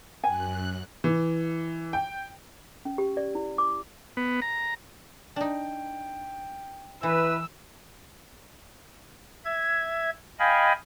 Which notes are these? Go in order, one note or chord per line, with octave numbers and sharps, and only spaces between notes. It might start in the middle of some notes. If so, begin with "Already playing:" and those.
F#2 G#5 F#6
E3
G5
C#4
G4
D5
E4
D6
B3
A#5
D4 D#4 G5
E3 E4 B4 E6
E5 G#6
D#5 F5 G5 G#5 B5